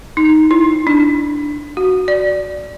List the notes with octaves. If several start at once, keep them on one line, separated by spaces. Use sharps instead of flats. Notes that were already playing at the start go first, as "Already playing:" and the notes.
D#4
E4
D4
F#4
D5